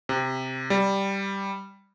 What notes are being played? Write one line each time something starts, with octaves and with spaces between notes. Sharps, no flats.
C3
G3